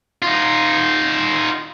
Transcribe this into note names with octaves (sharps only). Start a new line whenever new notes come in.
D#4 F4